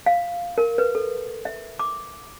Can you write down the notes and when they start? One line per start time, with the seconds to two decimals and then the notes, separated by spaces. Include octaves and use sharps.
0.06 F5
0.58 A#4
0.78 B4
0.95 A4
1.45 E5
1.79 D6